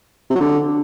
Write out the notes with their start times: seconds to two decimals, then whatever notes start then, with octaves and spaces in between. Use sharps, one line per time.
0.30 C3
0.35 F#3
0.40 D3